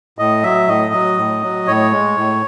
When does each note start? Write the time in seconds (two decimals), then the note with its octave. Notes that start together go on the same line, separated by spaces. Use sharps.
0.19 A2 D#5
0.43 F#3 E5
0.68 A2 D#5
0.93 F#3
1.18 A2
1.43 F#3
1.67 A2 C#5
1.92 G#3
2.17 A2